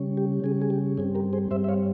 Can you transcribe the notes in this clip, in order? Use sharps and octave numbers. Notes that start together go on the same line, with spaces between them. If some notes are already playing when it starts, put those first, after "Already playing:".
Already playing: C#3 G3 C#4
G4
C#3 G3 C#4 G#4
G#4
G4
G2 G3 C4 G#4
G4 A#4
G#4 C5
G2 G3 C4 C5 E5
E5
C#5 F5